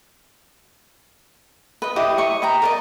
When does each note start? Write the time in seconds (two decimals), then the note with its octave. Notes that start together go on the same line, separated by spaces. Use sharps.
1.82 B4 D#5
1.96 E4 G4 D#5 D6
2.18 D#5 C#6
2.42 B4 G5 A#5
2.62 A#4 D5 D#5